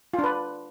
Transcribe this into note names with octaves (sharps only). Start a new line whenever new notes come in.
F4
D4
B4